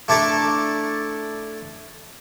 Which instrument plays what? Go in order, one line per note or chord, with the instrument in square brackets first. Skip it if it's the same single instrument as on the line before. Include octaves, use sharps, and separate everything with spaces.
[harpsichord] A3 D4 E4 A4 A#5